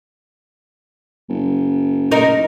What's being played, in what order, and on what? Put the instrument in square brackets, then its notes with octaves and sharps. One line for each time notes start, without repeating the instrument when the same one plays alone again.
[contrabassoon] F#1
[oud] D#4 A#4